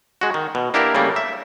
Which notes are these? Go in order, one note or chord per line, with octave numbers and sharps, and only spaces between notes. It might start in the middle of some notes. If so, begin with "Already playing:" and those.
G#3 F#4
D#3
B2
A#3 D4 E4 G4 A#4
C#3 G3 A3 A#3
E5